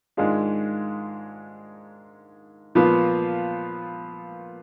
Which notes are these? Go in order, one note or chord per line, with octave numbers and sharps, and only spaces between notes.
G#2 D#3 G#3 D4 F4
A#2 F3 B3 F4